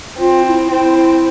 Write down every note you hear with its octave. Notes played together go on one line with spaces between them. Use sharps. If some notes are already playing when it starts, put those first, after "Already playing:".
C4 F4
E4
C4 E4